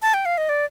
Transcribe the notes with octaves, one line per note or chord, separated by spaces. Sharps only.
A5
G5
F5
D#5
D5